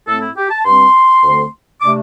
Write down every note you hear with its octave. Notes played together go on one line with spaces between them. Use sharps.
A2 A3 C4 A4
E4
G4
A5
G2 G3 C4 C6
D2 D3 A3 C4
C3 A3 D4 D6